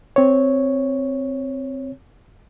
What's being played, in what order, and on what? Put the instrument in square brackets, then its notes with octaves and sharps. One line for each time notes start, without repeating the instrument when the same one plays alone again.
[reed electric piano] C4 C#5